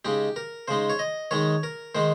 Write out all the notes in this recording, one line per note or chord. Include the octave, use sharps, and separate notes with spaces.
C#3 G#3 D#4 G4
A#4
C#3 G#3 D#4 C5
C#5
D#5
D#3 G#3 D#4 C#5
A#4
D#3 G#3 D#4 C5